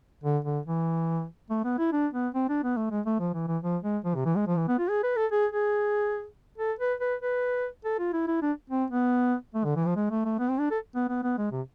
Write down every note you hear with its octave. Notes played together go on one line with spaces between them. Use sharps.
D3
D3
E3
A3
B3
E4
D4
B3
C4
D4
B3
A3
G#3
A3
F3
E3
E3
F3
G#3
F3
C3
E3
G#3
F3
E3
B3
F4
G#4
B4
A4
G#4
G#4
A4
B4
B4
B4
A4
F4
E4
E4
D4
C4
B3
A3
D3
E3
F3
G#3
A3
A3
B3
C4
D4
A4
B3
B3
B3
G#3
C3